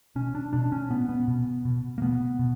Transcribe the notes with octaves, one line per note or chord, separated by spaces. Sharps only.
B2 C#4
D4
B2 D4
C#4
A#2 B3
B3
B2
B2
A#3
B2 B3
B2